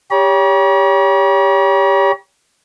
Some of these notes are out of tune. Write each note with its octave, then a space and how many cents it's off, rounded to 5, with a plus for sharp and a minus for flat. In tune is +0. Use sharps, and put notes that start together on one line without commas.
G4 +15 C#5 +30 A#5 +45